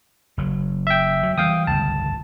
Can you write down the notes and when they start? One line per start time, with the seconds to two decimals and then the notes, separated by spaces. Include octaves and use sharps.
0.38 F#1 F#3
0.87 E5 G5
1.23 F#3
1.38 E3 G3 F5 G5 D#6
1.67 G1 C#2 A5